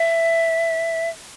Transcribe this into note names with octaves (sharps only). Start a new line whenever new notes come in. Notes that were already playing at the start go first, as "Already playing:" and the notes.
Already playing: E5